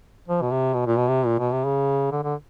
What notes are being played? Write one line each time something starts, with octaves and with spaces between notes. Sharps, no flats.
F3
B2
C3
B2
A#2
B2
C3
A#2
B2
C3
C#3
D3
D3